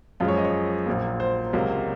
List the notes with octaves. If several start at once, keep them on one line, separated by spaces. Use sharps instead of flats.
F#2 F3 G#3 F4
C#5
D#5
C#5
A#1 A#2 F#3 A#3
C5
C#2 C3 F#3 A#3